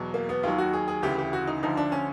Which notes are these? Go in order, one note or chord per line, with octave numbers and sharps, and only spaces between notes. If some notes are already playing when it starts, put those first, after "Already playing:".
Already playing: E2 B2 F#3
A#3
B3
D#2 D#3 F#3 F4
F#4
G#4
G#4
D2 C#3 E3 G4
G4
F#4
D#4
D2 D3 F3 D#4
D4
C#4